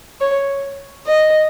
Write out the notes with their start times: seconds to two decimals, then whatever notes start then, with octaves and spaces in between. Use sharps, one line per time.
0.21 C#5
1.06 D#5